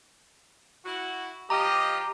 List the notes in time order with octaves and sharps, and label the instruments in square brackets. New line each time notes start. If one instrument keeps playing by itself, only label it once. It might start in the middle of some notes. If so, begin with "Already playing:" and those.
[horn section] E4 F#4
[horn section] F3 D#5 [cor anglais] G4 [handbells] A#5